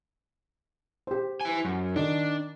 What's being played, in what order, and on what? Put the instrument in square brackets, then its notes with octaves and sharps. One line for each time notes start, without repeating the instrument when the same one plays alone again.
[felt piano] G4 C5
[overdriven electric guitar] E4 G#5
F#2
[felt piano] D#3 [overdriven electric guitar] D4